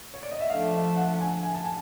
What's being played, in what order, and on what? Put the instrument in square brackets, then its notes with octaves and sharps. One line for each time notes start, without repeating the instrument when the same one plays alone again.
[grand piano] C#5
D5
D#5
E5
[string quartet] F3 A3 D4 [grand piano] F5
[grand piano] E5
F#5
G#5
G#5
A5
G#5